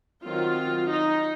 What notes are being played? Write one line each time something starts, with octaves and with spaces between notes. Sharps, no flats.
D#3 F#3 C4 F4
D#4